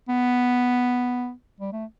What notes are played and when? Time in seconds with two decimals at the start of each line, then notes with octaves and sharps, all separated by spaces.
0.09 B3
1.61 G3
1.73 A3